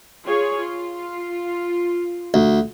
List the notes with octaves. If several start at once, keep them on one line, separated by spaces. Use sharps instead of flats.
F4 G#4 C#5
F4
D2